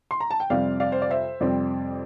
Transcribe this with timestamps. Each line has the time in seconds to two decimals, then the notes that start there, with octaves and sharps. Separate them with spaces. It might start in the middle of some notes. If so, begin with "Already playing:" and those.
0.11 C6
0.20 A#5
0.31 A5
0.40 G5
0.50 F2 C3 G3 C4 D5 F5
0.80 D5 F5
0.92 C5
1.02 D5
1.11 C5 E5
1.40 F2 C3 G3 C4 D5